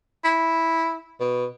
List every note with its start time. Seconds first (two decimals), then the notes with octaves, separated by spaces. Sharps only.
0.24 E4
1.20 B2